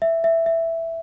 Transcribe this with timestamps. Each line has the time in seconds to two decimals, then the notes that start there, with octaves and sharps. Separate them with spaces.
0.02 E5
0.24 E5
0.46 E5